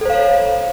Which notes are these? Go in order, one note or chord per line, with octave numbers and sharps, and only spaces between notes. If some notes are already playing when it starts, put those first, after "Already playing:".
A4 C5 C#5 F5